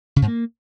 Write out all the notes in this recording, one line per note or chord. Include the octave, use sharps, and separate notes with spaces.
C#3
G#2
A#3